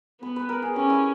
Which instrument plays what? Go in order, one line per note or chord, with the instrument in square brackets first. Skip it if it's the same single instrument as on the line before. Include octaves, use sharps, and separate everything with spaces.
[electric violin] B3 [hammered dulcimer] B4
[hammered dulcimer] B4
A#4
G#4
[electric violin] C#4 [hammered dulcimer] G4
[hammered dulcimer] E4